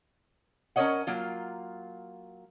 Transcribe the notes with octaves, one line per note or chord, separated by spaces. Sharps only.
C#4 A#4 B4 C#5 D#5 F#5
F#3 A#3 F4